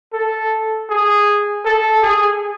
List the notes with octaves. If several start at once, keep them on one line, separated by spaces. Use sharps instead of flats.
A4
G#4
A4
G#4